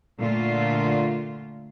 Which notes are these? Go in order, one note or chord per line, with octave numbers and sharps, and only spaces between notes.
A#2 D3 A3 F4